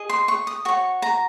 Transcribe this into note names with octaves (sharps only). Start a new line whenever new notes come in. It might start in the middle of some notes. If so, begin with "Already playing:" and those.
Already playing: G#4 D#5
C6
C#6
D#6
F#4 C#5 C#6
A#5